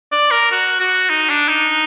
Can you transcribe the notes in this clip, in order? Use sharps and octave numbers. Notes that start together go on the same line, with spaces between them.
D5
A#4
F#4
F#4
D#4
D4
D#4